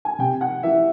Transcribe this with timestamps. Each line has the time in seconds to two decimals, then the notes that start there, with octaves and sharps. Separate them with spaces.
0.05 G#5
0.19 C3 G5
0.41 F#5
0.63 E3 E5